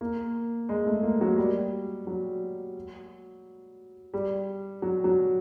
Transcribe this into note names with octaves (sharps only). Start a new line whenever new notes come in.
A#3
G#3
A3
A#3
F#3
G3
F#3
G3
F#3
F#3